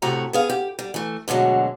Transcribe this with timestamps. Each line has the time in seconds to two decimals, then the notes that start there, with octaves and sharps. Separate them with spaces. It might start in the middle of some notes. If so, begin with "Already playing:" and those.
0.02 A2 C3 A3 F#4 G4 A#5
0.33 B3 G#4 F5
0.50 G4
0.79 G3
0.94 E3 A3
1.28 D2 B2 D3 F#3 G#3